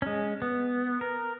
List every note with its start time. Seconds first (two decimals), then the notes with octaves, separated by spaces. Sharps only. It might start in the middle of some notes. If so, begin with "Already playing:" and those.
0.02 G#3 C#4
0.42 B3
1.01 A#4